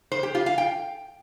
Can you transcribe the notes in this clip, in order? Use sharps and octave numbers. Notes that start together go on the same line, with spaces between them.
C5
G4
F4
F5
G5